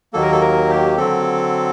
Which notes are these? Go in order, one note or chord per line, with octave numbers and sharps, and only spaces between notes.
D#2 D#3 F#3 A#3 A4
A#4
A4
A#4
G4
D3 F#3 C4 A4